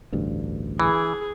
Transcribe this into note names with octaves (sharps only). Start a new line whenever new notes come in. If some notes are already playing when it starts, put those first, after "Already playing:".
A1 D2 G2
E3 G#4